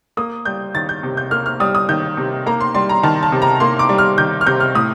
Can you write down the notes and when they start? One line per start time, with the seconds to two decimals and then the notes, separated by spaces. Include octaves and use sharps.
0.17 A#3 D#6
0.45 G3 G6
0.74 D#3 A6
0.89 G6
1.03 C3
1.17 G6
1.31 A#3 F6
1.46 F6
1.60 G3 D#6
1.75 D#6
1.89 D#3 G6
2.17 C3
2.46 A#3 A#5
2.61 C6
2.74 G3 C6
2.89 A#5
3.03 D#3 A5
3.23 A5
3.32 C3
3.42 A#5
3.60 A#3 C6
3.79 D6
3.89 G3
3.98 F6
4.18 D#3 G6
4.41 F6
4.46 C3 G6
4.60 F6
4.75 A2 D#6